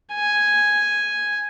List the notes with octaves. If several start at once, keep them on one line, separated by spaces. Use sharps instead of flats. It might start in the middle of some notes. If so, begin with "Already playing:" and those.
G#5